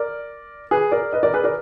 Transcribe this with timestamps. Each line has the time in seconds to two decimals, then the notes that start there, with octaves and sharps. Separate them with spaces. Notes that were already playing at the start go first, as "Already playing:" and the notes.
Already playing: A#4 D5
0.71 G#4 B4
0.92 A#4 D5
1.13 B4 D#5
1.23 A#4 D5
1.34 G#4 B4
1.44 A#4 D5